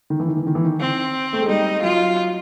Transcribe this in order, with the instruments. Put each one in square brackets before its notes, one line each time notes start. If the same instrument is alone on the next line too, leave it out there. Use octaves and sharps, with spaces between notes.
[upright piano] D#3
E3
D#3
E3
D#3
E3
D#3
[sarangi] C4
[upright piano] A3
G#3
[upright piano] G3 [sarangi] D#4
[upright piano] F#3 [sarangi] F4